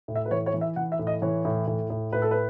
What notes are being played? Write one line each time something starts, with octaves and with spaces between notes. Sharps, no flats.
A2
E5
B4
E3 C#5
C#5
E3
E5
E3 F#5
E5
A2
D#5
E3 C#5
A2
A2
A2
A2 B4
A4
B4